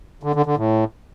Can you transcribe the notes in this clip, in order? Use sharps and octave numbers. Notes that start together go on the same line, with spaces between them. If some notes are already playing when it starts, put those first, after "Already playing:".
D3
D3
D3
A2